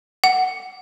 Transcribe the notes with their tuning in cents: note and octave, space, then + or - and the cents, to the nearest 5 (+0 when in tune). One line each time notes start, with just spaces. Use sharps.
F#5 +10